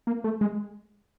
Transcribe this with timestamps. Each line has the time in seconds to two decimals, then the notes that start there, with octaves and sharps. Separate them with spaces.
0.07 A#3
0.24 A3
0.41 G#3